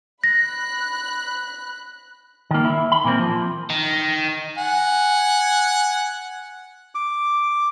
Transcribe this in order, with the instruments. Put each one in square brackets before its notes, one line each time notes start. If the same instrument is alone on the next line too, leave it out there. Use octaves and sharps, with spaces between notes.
[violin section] B5 F#6 [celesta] A#6
[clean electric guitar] D#3 A#3
E4
B5
A#2 E3 A#3 C4
F3
[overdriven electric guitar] D#3
[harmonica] F#5 G#5
[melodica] D6